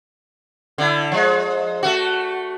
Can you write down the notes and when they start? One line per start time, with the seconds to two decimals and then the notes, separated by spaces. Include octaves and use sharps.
0.78 D3 E4
1.12 F3 G#3
1.83 A3 F#4